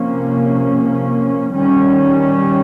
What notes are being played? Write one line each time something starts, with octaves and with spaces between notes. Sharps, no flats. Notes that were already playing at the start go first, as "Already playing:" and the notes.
Already playing: C3 F3 A#3 C#4
D#3 G3 C#4